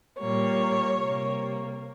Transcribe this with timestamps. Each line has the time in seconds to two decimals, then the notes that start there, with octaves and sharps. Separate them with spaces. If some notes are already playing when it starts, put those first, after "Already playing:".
0.19 A#2 G3 A#3 C#5
0.98 C3 G3 A#3